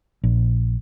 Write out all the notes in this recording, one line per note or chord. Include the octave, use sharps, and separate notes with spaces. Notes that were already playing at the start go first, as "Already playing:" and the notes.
A#1